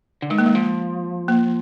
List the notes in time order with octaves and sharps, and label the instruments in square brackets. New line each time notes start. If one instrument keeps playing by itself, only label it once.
[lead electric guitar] D3
[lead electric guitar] D#3 [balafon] G#3
[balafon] A#3
G#3
[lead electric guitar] F3
[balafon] A#3